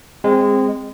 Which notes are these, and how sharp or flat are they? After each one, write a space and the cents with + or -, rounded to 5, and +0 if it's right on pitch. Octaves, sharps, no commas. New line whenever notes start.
G#3 -20 C4 +0